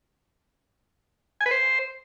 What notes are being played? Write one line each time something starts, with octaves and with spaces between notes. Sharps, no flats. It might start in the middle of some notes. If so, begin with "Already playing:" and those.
G#5
B4
C5